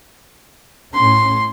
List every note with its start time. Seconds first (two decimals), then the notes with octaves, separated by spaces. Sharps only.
0.94 A2 C#4 C6